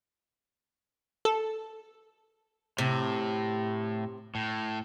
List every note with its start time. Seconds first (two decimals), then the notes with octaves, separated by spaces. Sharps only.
1.25 A4
2.78 A2 C3
4.35 A2